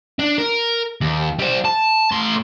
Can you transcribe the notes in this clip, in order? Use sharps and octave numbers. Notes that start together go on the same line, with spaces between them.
D4
A#4
D#2
G3 C5
A5
A2 C6